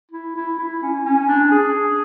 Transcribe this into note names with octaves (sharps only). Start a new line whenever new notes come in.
E4
E4
E4
C#4
C#4
D4
G#4